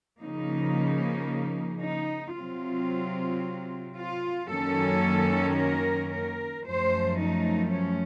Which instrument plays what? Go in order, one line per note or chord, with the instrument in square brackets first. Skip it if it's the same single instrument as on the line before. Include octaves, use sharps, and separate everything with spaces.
[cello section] C#3 F3 A#3 D#4
D#4
C3 F#3 C4 F4
F4
F#2 D#3 F#3 A#3 C#4 A4
A#4
A#4
F#2 F3 A3 C5
D#4
C#4